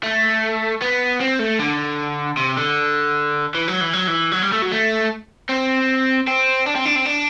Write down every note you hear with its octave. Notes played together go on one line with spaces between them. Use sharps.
A3
B3
C4
A3
D3
C3
D3
E3
F#3
E3
F#3
E3
F#3
G3
A3
F#3
A3
C4
C4
D4
C4
D4
C4
D4